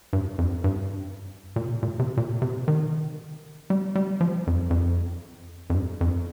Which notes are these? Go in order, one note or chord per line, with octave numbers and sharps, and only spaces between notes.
G2
F2
G2
A#2
C3
A#2
C3
A#2
C3
D#3
G3
G3
F3
F2
F2
F2
G2
F2